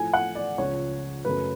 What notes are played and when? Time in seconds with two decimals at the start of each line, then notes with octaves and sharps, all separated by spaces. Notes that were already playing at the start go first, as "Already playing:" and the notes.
Already playing: A2 F3 A3 G#5
0.13 F#5
0.35 D5
0.58 C#2 C#3 F3 C#5
1.25 F#2 C#3 F#3 A3 B4